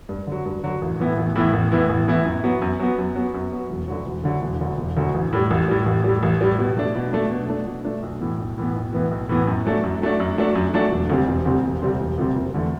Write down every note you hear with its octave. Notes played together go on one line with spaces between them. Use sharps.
G2
D3 F#3
G2
D3 F#3
A1
A2 E3 B3 E4
A1
A2 E3 B3 E4
A1
A2 E3 B3 E4
A1
A2 E3 B3 E4
F#2
F#3 B3
F#2
F#3 B3
F#2
F#3 B3
F#2
F#3 B3
E1
D2 D3 F#3
E1
D2 D3 F#3
E1
D2 D3 F#3
E1
D2 D3 F#3
A1
A2 G3
A1
A2 G3
A1
A2 G3
A1
A2 G3
B2
A3 D4
B2
A3 D4
B2
A3 D4
B2
A3 D4
B1
A2 E3 B3
B1
A2 E3 B3
B1
A2 E3 B3
B1
A2 E3 B3
F#2
F#3 A3 D4
F#2
F#3 A3 D4
F#2
F#3 A3 D4
F#2
F#3 A3 D4
E1
D2 C3 G3 C4
E1
D2 C3 G3 C4
E1
D2 C3 G3 C4
E1
D2 C3 G3 C4
F#1
E2 D3 A3